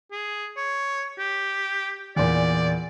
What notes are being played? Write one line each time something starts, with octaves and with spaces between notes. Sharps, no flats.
G#4
C#5
G4
E2 A#2 D5